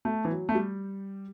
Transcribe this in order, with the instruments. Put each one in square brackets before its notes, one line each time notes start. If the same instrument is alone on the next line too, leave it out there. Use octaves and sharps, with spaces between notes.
[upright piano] A3
E3
F#3
A3
G3